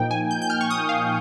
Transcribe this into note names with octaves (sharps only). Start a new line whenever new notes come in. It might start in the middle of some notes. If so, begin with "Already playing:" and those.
Already playing: A#2 F3 A#3 D#4 G5
G#5
G6
G6
F6
C#6
D#6
F5